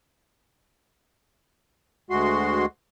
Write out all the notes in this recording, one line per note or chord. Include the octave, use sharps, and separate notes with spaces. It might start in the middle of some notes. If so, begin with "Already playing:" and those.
D2 G#3 F#4 C6